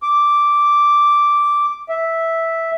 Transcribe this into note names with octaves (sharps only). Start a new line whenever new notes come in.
D6
E5